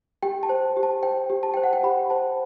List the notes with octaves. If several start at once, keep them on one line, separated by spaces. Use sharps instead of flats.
G4 G5
A5
C5
G4
A5
C5 G5
G4
A5
C5 G5
F#5
G5
G4 B5
C5 A5